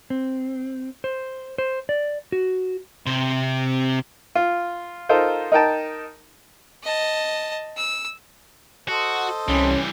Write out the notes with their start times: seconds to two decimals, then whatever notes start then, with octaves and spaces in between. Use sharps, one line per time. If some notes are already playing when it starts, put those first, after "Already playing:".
0.10 C4
1.04 C5
1.58 C5
1.89 D5
2.32 F#4
3.06 C3 C5
4.35 F4
5.09 D#4 F4 A4 A#4 C5
5.52 D#4 A#4 G5 A5
6.83 D#5 A5
7.77 E6
8.89 F#4 A4 C5 D#5
9.48 C2 E3 G3 C#4